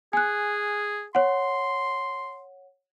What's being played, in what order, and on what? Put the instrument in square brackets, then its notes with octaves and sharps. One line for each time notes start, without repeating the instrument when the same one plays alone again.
[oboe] G#4 [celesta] G#5 F#6
[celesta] C#5 F#5 [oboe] C6